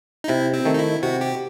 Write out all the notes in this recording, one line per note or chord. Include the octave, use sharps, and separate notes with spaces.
D#4
C3 E4
C4
D#3 A3
D#4
E4
C3 F#4
G4